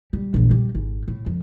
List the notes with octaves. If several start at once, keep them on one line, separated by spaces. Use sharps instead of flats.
G3
A#1 E2
G3
G#1
A2
F2